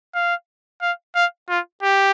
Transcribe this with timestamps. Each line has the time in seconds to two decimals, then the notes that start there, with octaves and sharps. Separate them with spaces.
0.15 F5
0.82 F5
1.15 F5
1.49 F4
1.83 G4